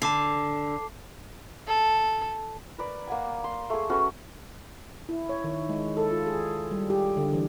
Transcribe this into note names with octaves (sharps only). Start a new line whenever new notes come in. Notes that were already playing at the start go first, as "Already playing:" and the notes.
D3 A5 D6 C7
A4
A#4 B4 D5
A#3 F#5 G#5
C6
A3 G#4
C#4 F#4 A4 B4
E4
C#5
D#3
G#3
A4
F4
G#4
G3
G4
D3
E3